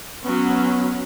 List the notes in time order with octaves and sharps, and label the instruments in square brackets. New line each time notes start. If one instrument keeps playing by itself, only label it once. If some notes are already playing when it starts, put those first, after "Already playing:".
[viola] F#3 C#4 [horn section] B3